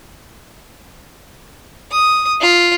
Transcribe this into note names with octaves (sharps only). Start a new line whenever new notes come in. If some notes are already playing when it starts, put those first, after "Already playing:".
D#6
F4